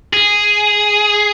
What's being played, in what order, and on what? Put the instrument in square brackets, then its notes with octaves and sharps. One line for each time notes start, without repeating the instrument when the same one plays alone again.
[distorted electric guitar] G#4